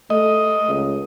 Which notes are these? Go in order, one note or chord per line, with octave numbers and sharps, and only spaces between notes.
A3 D#5
C#2